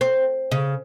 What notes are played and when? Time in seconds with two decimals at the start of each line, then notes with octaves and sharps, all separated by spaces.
0.01 C4
0.51 C#3